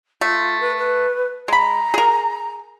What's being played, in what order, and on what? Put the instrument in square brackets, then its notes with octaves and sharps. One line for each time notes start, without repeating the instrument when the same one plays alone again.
[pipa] A3 [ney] F4
[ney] B4
B4
[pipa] G#3 B5 [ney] A#5
[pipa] G#4 A#4